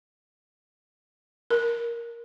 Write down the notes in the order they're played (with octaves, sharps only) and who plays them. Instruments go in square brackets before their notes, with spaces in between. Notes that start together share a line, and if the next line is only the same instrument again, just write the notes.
[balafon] A#4